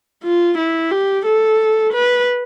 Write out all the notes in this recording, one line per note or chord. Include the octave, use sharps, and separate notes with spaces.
F4
E4
G4
A4
B4